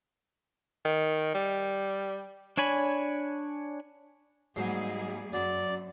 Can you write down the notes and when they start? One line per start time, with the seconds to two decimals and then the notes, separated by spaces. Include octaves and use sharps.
0.85 D#3
1.34 G3
2.57 D4 C#5 G#5 B5
4.56 G#2 F#3 G3 A#3 G#4 C6
5.33 F#2 F#3 D5